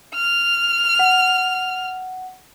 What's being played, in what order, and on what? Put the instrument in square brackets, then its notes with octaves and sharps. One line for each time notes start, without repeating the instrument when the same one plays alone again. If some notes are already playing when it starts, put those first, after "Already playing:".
[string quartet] F6
[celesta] F#5